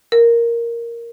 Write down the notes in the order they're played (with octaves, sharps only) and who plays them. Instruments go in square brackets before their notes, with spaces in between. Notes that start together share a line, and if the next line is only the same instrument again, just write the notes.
[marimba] A#4